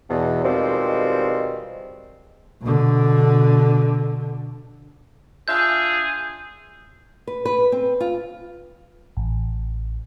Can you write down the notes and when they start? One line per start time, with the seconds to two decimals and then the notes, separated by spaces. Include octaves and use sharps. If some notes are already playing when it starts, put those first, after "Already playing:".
0.09 E2 B2
0.44 B2 D#3 F3 G3 G#3 C4
2.62 B2 D3
5.48 D4 F4 G#4 E5 G6
7.27 B4
7.45 B4
7.72 C4
8.00 F4
9.17 A1